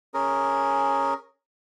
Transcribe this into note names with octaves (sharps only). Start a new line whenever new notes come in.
C#4 G#4 A#4